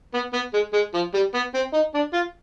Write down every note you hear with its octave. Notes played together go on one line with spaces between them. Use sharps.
B3
B3
G#3
G#3
F3
G3
B3
C4
D#4
D4
F4